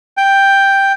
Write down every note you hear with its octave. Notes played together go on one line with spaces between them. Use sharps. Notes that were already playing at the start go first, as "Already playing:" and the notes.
G5